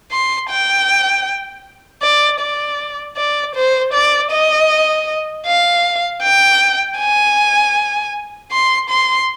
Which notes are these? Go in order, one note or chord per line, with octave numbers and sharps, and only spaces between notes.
C6
G5
D5
D5
D5
C5
D5
D#5
F5
G5
G#5
C6
C6